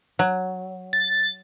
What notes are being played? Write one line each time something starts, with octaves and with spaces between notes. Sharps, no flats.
F#3
A6